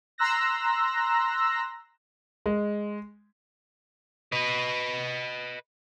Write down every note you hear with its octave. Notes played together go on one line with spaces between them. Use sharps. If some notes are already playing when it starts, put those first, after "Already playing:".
A#5 C6 E6 F#6 A#6
G#3
B4 D#5